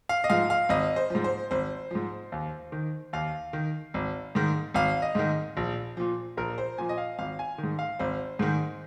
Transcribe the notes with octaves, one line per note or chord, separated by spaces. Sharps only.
F5
D#5
G#2 F3 F5
F5
G#1 D#5
C5
G#2 F3
C5
G#1 C5
G#2 F3
D#2
D#3
D#2 F5
D#3
G#1
G#2 D#3
G#1 F5
D#5
G#2 D#3
A#1
A#2 F3
A#1 A#4
C5
A#2 F3 G#5
D#5
F5
G#1 F5
G#5
D#3
G#2
F5
G#1 C5
G#2 D#3